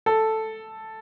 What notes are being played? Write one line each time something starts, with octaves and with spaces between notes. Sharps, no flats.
A4